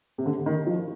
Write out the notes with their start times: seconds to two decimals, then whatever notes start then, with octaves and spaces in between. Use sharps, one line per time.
0.18 C3
0.26 D3
0.46 D#3
0.67 F3